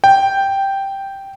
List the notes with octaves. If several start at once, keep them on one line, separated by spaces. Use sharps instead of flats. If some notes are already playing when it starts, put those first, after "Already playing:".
G5